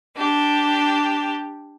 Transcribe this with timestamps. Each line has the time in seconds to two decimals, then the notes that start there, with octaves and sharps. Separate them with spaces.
0.17 D4 G4